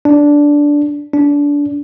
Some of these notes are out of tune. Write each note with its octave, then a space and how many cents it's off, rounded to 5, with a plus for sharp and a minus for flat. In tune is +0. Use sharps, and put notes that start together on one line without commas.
D4 -10
D4 -25